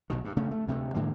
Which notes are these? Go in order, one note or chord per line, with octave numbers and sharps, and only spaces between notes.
B1 B2 D#3
G2
C#3 A3 C#4
A3
D2 C3 G3 A3
G#2 D3 E3 A#3